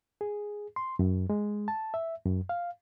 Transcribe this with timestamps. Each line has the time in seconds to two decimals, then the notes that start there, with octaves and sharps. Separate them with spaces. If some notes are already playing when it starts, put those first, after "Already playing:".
0.21 G#4
0.76 C6
0.99 F#2
1.30 G#3
1.68 A5
1.94 E5
2.26 F#2
2.49 F5